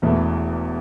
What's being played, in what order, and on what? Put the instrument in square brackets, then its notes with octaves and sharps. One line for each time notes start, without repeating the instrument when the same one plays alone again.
[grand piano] E1 E2 E3 A3